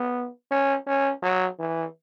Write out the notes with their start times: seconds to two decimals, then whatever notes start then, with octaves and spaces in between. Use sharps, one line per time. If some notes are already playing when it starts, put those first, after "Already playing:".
Already playing: B3
0.51 C#4
0.86 C#4
1.22 F#3
1.59 E3